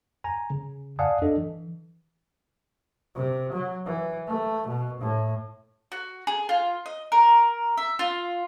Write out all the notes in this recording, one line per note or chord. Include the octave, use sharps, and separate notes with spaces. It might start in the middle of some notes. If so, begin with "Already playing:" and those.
G#5 A#5
C#3
D5 F5 F#5 G#5 A5 D#6
D4 A4 D#5
E3
C3
F#3
E3
A3
B2
A2
F#4
G#4
F4
D#5
A#4
E5
F4